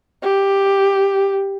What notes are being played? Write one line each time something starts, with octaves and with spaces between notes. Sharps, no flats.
G4